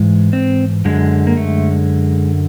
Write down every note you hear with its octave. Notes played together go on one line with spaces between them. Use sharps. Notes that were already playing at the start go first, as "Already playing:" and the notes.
Already playing: G#2 E3 G#3
C4
F#2 D3 G#3
A#3
A3